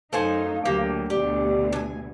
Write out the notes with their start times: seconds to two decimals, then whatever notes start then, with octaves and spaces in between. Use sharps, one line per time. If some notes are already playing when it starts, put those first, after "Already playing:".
0.13 F#2 A3 D#4 C5 F5 G#5
0.65 D2 F#3 A#3 G4
1.10 D2 B2 G4 D5
1.73 D4 G#5